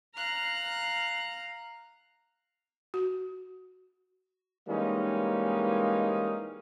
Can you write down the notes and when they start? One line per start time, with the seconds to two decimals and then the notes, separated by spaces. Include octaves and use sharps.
0.16 F5 A#5 F6 F#6
2.94 F#4
4.69 E3 G3 G#3 A#3 C#4 D#4